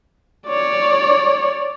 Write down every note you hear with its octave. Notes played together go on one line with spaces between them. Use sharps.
C#5 D5